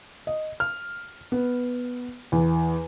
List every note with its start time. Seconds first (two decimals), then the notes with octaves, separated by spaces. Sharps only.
0.27 D#5
0.60 F6
1.32 B3
2.32 E2